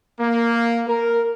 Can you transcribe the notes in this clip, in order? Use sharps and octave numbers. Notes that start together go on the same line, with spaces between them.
A#3
A#4